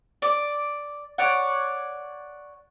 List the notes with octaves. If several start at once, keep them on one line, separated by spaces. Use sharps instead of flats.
D5
C#5 D5 F#5